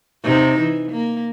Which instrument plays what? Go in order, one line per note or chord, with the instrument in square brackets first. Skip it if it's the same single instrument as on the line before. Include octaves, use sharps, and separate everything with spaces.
[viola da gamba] C3 D#4
E3
A#3